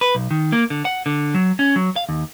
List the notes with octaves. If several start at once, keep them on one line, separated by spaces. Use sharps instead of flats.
B4
B1
D#3
A#3
D3
F#5
D3
F#3
C#4
F#3
F5
D#2